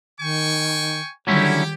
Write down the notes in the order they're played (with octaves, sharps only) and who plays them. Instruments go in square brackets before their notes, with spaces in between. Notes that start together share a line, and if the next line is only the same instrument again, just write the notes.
[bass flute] D#3 [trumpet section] G5 G#5 C#6
[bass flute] D3 [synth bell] D#3 G3 G#6 [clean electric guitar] F#3 C#4 E4 [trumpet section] G4